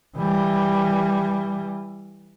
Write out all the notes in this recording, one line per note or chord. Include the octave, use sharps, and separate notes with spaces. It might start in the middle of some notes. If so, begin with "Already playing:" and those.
E3 G3